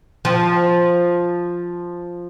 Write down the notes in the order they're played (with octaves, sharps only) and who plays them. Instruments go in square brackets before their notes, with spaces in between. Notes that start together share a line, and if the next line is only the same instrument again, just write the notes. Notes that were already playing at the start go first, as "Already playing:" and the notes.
[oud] F3